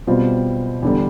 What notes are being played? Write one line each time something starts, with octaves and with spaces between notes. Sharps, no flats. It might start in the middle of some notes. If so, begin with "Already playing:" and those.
B2 G3 C4 F4
E2 D3 G3